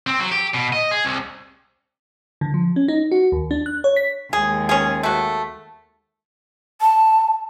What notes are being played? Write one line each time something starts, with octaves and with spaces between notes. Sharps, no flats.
C4
F#3
G4
B2
D#5
G#4
C2
D3
F3
C#4
D#4
F#4
D#2
D4
F#6
C#5
B6
D#2 G#3 G#4
C#4 G#4
A3 F#4
A5